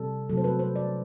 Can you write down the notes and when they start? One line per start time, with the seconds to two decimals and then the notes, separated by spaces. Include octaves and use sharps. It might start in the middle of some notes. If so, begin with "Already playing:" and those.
Already playing: C3 G3 A4
0.29 C3 F#3 A3 A4
0.37 C5
0.44 B4
0.59 C5
0.76 D5